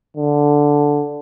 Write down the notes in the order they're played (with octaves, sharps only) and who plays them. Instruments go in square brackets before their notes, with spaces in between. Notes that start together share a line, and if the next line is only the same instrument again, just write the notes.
[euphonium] D3